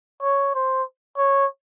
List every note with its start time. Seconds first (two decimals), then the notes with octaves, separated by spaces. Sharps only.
0.22 C#5
0.55 C5
1.17 C#5